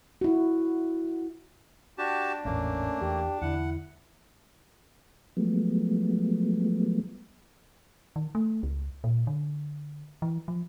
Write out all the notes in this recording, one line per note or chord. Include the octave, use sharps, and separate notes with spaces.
E4 F#4
D4 F#4 G4 A5
G#1 E2 A2 A3 A#3 C#4
E2 G4
E2 D3 E4 F#5
F3 F#3 G#3 A3 B3
D#3
A3
C#2
A#2
D3
E3
F3